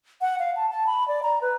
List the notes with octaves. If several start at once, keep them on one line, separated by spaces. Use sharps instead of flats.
F#5
F5
A5
A5
B5
D5
A#5
B4